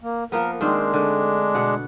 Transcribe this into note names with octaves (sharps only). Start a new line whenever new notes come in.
A#3
F3 A#3 B3 A#4
D#3 G#3 C4 D4 C5
D3 A3
B2 D5 F#5